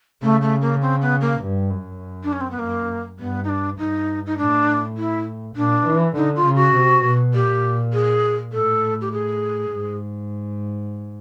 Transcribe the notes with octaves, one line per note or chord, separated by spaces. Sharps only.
C#3 A3
A3
A#3
C4
B3
A#3
G2
F#2
D4
C#4
C4
B3
F#2 A#3
G2 B3
D#4
D4
G2 D#4
D#4
A2 D4
E4
A#2 D4
E3
D3 D#4
F4
C#3
F#4
C3
B2
A#2 G4
G#4
A2 A4
G4
G#4
G#2